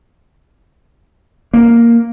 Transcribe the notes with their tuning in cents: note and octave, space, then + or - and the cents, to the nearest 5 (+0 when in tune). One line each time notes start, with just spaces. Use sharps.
A#3 +0